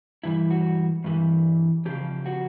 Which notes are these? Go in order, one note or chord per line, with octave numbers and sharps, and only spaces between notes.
G2 E3 G3 E4
F#4
G2 E3 G3
F2 C#3 F3 G4
F#4